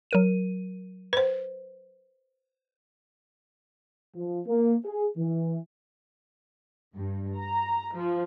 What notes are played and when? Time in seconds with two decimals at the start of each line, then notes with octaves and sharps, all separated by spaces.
0.11 F#3 A#4 D#7
1.13 B4 C5
4.15 F3
4.46 A#3
4.85 G#4
5.17 E3
6.94 G2
7.39 A#5
7.94 F3